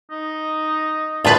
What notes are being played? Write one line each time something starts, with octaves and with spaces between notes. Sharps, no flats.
D#4
D2 F4 B4 A5